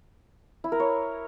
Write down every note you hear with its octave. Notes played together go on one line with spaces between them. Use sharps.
E4
A#4
C#5